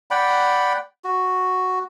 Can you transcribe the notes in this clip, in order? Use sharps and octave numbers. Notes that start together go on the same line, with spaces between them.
D5 F#5 G5 B5
F#4